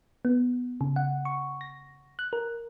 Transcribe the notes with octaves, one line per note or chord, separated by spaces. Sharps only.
B3
C#3
F#5
C#6
A#6
F#6
A#4